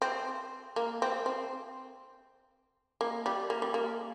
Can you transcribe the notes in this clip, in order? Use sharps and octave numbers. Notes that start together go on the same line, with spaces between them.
C4
A#3
C4
C4
A#3
G3
A#3
G3
A#3